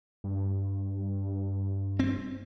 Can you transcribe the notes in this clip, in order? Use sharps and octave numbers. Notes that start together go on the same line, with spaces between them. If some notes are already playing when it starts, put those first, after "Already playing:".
G2
C4